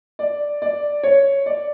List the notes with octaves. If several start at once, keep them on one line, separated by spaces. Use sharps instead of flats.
D5
D5
C#5
D5